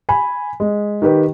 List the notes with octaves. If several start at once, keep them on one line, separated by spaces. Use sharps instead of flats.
G#5 B5
G#3
D#3 G4 B4